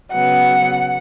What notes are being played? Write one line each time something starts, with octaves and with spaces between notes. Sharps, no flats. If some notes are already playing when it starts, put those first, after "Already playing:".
C#3 F#3 B3 F#5